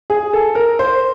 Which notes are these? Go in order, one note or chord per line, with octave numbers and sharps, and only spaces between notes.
G#4
A4
A#4
C5